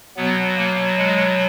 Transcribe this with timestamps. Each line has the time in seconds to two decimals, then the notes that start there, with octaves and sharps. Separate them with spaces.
0.16 B2 F#3 B3
0.57 A#3
0.98 G#3